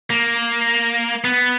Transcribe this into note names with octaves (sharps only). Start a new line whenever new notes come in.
A#3
B3